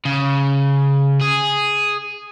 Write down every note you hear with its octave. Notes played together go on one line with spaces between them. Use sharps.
C#3
G#4